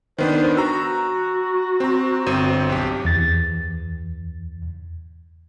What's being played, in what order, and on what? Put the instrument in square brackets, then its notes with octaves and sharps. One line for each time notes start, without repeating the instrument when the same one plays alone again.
[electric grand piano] D#3 B3 D4 [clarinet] C5
[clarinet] F#4 [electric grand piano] A#5 E6
[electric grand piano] C4 A#5
G1 C4 D#7
B1 G4
[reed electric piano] E2 A6